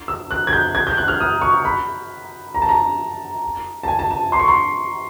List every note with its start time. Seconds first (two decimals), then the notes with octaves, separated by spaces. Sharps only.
0.08 E6
0.31 F#6
0.47 G#6
0.53 G6
0.75 G#6
0.87 G6
0.97 F#6
1.08 F6
1.20 D#6
1.42 C#6
1.65 B5
2.55 A#5
2.62 A5
2.69 A#5
3.83 A5
3.88 G#5
3.99 A5
4.11 A5
4.32 C6
4.39 C#6
4.48 C6